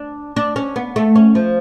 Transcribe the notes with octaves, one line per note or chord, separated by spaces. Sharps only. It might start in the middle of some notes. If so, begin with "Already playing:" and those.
Already playing: D4
D4
C#4
B3
A3
C#4
F3